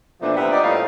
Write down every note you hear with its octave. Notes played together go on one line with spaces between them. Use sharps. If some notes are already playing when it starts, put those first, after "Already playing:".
A#2 E3 F3 A3 B3 D4
C3 B3 E4 G4 E5 F#5
D#4 D5 D#5
A2 F3 G3 D#4 F4 F5